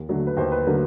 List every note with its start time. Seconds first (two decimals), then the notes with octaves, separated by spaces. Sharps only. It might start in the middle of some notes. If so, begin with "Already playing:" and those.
Already playing: D#2
0.09 D3 F#3 A3
0.27 B4
0.37 D#2 C5
0.52 B4
0.66 D3 F#3 A3 A#4